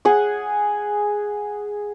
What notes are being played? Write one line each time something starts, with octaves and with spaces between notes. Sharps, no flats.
G#4 F#5